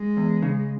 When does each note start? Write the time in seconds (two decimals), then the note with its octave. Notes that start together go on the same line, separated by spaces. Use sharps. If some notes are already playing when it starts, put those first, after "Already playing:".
Already playing: G#3
0.17 E2
0.42 C#3